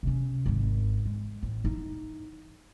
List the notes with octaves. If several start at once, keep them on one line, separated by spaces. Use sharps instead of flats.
C3 C#4
G#1 D#3
G#3
A1
D#4 E4